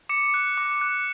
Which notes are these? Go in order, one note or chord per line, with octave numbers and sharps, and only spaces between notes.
D6 C#7
F#6
D6
F#6